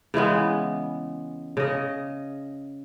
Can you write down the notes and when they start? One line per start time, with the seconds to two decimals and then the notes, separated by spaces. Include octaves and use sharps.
0.14 C#3 E3 G#3 B3
1.57 C#3 D#5